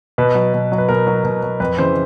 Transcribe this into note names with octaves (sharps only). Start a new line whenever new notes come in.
B2 B4
F#3
B2
F#3
B4
B2 A#4
F#3
B2
F#3
F2 B4
C#3 E3 C5